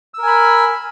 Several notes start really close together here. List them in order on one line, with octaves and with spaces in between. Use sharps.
E6 A#4 G#5 B5